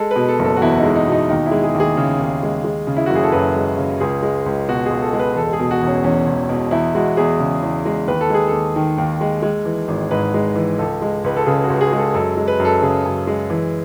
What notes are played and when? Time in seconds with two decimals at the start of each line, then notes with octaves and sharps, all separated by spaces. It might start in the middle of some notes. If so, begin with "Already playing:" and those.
Already playing: G#3 A4
0.11 B2 B4
0.28 A4
0.39 F#1
0.44 A4
0.57 F#4
0.61 E2 E4
0.78 D#4
0.84 G#3
0.96 D#4
1.07 B2 D#4
1.29 D#2 D#4
1.46 E4
1.51 G#3
1.63 G#4
1.74 D#2
1.80 G#4
1.97 C#3
2.19 D#2
2.43 G#3
2.64 G#3
2.87 C#3
2.97 E4
3.06 F#1 F#4
3.15 G#4
3.24 A4
3.32 F#2 B4
3.56 G#3
3.78 C#3
4.00 C#2 G#4
4.23 G#3
4.46 C#2
4.69 B2 F#4
4.86 C#2 G#4
5.02 A4
5.13 G#3
5.19 B4
5.36 E1 A4
5.53 G#4
5.59 B2
5.71 F#4
5.81 E1
5.87 C#4
6.04 E2 C#4
6.27 E1
6.49 B2
6.71 E2 E4
6.95 G#3 F#4
7.17 E2 G#4
7.40 C#3
7.62 E2
7.85 G#3
8.07 D#2 B4
8.21 A4
8.30 G#3 G#4
8.48 D#2 A4
8.76 D#3
8.98 D#2
9.21 G#3
9.43 G#3
9.65 E3
9.88 G#1
10.11 G#2 B4
10.34 G#3
10.56 E3
10.78 C#2 A4
11.02 G#3
11.24 C#2 B4
11.37 A4
11.46 C#3 G#4
11.64 F#4
11.70 C#2
11.81 G#4
11.92 G#3
11.98 A4
12.14 F#2 A4
12.37 G#3
12.48 B4
12.60 F#2
12.65 A4
12.82 C#3 G#4
13.05 F#2
13.27 G#3
13.50 E3